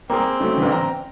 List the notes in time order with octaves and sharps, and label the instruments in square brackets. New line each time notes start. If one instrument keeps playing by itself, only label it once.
[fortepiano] A#3 G#4 [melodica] C4
[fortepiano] C#3 F#3 A3
A1 D3 E3
A#5